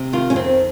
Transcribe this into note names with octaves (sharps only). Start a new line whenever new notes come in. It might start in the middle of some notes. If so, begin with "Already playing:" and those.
Already playing: C3
D#3 F4
C#4
F2 C4